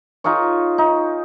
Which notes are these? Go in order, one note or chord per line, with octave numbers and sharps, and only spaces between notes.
D#4 F4 G#4 C#5
D#4